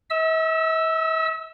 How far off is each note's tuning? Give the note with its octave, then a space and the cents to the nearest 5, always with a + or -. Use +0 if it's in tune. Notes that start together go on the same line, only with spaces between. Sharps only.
E5 -45 E6 +0